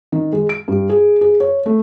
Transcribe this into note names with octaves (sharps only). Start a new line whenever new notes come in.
D#3
G#3
D7
G2
G#4
G#4
C#5
A3